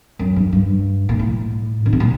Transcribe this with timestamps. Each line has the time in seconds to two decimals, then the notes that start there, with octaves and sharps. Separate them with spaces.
0.19 F#2
0.36 G2
0.52 G2
1.09 A#2
1.19 A2
1.86 D3
1.93 C3
2.00 A#2